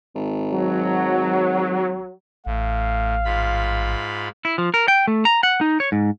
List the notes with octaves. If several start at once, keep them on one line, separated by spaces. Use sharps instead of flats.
G#1
F#3
A1 A2 F5
G#2 F4 B5
E4
F3
A#4
G5
A3
A#5
F#5
D#4
C#5
G#2